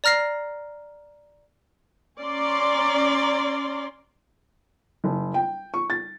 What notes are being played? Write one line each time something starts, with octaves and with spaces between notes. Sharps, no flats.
D5 A#5 F6 A#6 C7
C#4 D5 A#5 C6
F#1
G5
C#6
A6